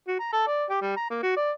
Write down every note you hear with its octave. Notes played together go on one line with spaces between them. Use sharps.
F#4
A#5
A4
D5
G4
G3
A#5
A#3
F#4
D5